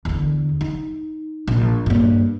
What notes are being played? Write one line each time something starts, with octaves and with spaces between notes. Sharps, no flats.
E2 D3
D#4
A#1
G2 A#3